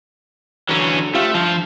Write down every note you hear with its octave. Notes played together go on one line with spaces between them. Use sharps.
D3 E3 F#3 C#4
A3 F4 G4 C5
G2 A#2 F3